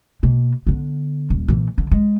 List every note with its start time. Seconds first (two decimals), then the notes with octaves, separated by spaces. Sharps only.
0.23 B2 A#3
0.67 D3 B3
1.30 D#1
1.48 A#2 E3
1.78 D3 E3
1.91 G#3